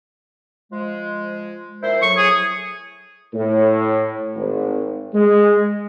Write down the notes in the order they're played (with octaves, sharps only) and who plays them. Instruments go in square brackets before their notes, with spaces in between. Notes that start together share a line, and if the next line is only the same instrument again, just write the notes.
[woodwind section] F3 G#3
A#2 E4 C5
[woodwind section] A2 F#3 [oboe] C#6
[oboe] G#4
[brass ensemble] A2
G#1
G#3